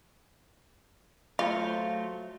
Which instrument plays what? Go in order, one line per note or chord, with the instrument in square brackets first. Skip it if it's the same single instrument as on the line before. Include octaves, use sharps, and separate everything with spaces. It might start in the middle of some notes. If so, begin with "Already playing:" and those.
[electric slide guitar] F#3 A3 C5 [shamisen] F4